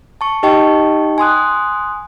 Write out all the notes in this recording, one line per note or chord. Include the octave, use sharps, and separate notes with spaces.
A5 C#6
D#4 G4 D#5 G5 A5 C#6
G#5 C6 D#6 F#6